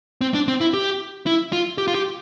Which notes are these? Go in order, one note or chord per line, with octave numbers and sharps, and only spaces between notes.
C4
D4
C4
E4
G4
E4
F4
G4
F4
G4